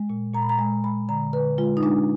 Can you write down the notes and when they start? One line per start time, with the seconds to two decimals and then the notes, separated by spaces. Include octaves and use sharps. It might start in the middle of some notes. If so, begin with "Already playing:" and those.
Already playing: G#3
0.10 A#2
0.34 A#2 A#5
0.42 B5
0.49 A#5
0.59 G#3
0.84 G#3 B5
1.09 D3 A#5
1.33 D3 B4
1.58 G#3 F4
1.77 D#4
1.83 G#3 D4